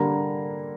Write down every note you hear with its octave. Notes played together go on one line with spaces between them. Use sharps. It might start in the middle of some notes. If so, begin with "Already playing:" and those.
Already playing: D3 G3 A#3 A#5